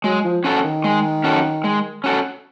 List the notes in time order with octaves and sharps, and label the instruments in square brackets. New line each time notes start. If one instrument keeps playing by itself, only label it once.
[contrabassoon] F#3 [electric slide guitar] G#3
[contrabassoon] F3
[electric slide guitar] C#4 F#4 A4
[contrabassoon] D#3
[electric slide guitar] G#3
C#4 F#4 A4
G#3
C#4 F#4 A4